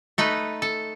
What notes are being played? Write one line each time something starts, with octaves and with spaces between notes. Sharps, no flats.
A3 D#4 B4
A4